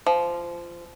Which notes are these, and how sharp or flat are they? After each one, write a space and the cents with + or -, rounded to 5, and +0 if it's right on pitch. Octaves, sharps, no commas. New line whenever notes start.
F3 -20